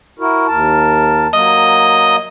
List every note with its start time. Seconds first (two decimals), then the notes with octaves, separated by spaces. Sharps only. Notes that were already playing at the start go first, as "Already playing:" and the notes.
0.19 E4 F#4 A#4
0.48 D#2 A#4 A5
1.33 F#3 A#3 D#5